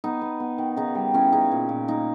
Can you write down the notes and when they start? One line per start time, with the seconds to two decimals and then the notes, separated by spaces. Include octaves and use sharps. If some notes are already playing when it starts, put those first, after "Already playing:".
0.04 B3 D#4
0.21 B3
0.40 B3
0.58 D#3
0.77 C#3 D#4
0.95 G3
1.14 E3 C#4
1.33 C#3 D#4
1.52 A#2
1.69 A#2
1.88 A#3 D#4